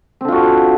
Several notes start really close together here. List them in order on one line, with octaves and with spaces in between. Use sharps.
C4 D3 F4 F#4